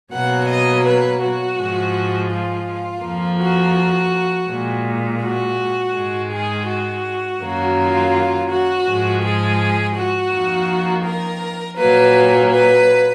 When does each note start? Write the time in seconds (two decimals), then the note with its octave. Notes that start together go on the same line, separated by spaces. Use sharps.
0.13 B2 F#3 A#3 F#5
0.49 D#5
0.85 B4
1.22 F#4
1.58 G#2 F3 G#3
2.31 F4
3.03 F2 F3 A#3
3.40 F#4
4.49 A#2 G#3
5.22 F#4
5.95 G#2 D#3 G#3
6.31 G#4
6.68 F#4
7.41 F#2 D#3 F#3 A#3
7.77 F4
8.50 F#4
8.87 G#2 F3 G#3
9.22 G#4
9.96 F#4
10.31 F2 D#3 A#3
11.05 A#4
11.77 A#2 F#3 A#3 B4
12.50 B4